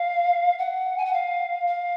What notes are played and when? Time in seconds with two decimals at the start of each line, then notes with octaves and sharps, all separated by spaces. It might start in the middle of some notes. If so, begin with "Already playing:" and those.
Already playing: F5
0.58 F#5
0.97 G#5
1.05 F#5
1.13 F5
1.67 F5